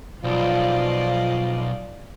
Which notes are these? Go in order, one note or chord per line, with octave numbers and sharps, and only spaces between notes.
B1 F3 F4 D5 D#5